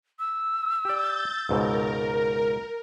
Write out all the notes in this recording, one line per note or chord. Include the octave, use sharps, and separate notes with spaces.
E6
G4 D5 G6 A6
C#2 G#2 B2 A#4